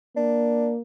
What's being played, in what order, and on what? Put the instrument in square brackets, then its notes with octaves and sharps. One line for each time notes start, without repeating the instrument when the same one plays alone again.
[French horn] A#3 [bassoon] D4